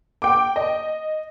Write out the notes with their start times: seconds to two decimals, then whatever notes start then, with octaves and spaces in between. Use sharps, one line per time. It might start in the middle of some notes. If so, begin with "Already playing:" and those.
0.22 G5 D6
0.56 D#5